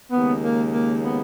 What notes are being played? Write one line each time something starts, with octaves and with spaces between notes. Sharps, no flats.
D#2 C#3 G#3 B3
A#3
A#3
B3